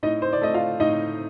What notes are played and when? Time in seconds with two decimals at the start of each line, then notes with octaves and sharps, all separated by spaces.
0.03 A2 D#4 D#5
0.22 C5
0.33 D5
0.41 A3 D#5
0.54 F4 F5
0.80 A2 D#4 D#5